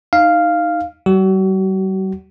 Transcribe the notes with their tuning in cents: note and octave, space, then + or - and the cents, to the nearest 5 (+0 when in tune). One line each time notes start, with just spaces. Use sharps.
D#4 +0 F5 -5
G3 -40 F#4 +35